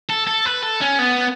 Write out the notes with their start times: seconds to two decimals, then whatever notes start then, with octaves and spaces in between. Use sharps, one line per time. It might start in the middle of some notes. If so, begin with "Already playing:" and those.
0.10 A4
0.27 A4
0.46 B4
0.63 A4
0.81 C#4
0.99 B3